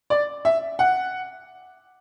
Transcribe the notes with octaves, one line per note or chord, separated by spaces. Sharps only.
D5
E5
F#5